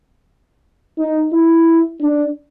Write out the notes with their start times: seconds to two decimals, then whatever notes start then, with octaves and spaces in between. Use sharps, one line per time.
0.98 D#4
1.33 E4
2.00 D4